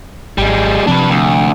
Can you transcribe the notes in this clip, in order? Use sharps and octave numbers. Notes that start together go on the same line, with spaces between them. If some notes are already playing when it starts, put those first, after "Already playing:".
G#1 G3 G#3
C3 F3 C4 D4 B4
D2